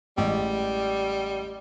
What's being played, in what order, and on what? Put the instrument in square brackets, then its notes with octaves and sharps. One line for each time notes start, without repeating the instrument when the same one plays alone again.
[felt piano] A1 G#3 [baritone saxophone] G3